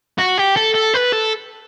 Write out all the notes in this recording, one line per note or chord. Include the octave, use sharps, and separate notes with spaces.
F#4
G4
A4
A4
B4
A4